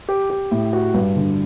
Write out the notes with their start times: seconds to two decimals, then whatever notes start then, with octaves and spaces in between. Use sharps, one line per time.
0.09 G4
0.30 G4
0.51 A2
0.73 F#4
0.94 G2
1.16 D3